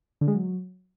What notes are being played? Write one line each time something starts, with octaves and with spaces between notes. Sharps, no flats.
D3
G#3
F#3